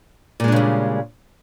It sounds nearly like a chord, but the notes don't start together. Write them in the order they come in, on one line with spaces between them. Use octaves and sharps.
A#2 G#3 D4 C#3 G3